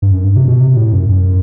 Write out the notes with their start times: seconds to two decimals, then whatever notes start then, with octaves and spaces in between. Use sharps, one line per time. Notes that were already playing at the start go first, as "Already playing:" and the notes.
0.02 G2
0.11 F#2
0.24 G2
0.36 C3
0.48 B2
0.60 C3
0.77 A2
0.93 F#2
1.09 F#2